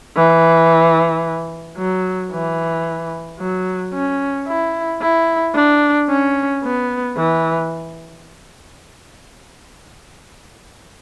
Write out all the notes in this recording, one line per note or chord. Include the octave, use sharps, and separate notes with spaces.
E3
F#3
E3
F#3
C#4
E4
E4
D4
C#4
B3
E3